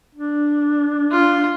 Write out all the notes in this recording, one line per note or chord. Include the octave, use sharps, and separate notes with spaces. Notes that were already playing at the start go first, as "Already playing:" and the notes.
D4
F4